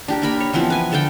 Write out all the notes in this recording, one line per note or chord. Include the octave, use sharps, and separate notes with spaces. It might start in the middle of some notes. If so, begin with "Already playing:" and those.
D4 G4 A#4
A#3 A#4 B5
C#5
E3 F3 B3 C4
B4 G#5
D3 A4 F5 G5